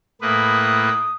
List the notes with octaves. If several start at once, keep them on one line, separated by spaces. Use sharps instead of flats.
A2 A#3 B4 D#6